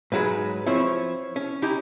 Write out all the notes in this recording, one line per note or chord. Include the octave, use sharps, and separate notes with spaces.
G#2 F#3 G#3 B4
F3 C4 E4 C#5
C#4
D#4 E4 G4